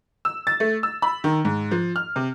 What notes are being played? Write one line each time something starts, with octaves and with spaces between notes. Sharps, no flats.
E6
A6
A3
E6
B5
D#3
G#2
F3
F6
C3